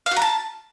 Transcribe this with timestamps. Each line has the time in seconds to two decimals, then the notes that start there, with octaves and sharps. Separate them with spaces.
0.06 F5
0.11 F#4
0.16 A#5
0.22 A5